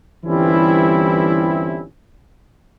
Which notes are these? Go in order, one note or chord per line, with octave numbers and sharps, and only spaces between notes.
G1 E3 G3 C4 C#4 E4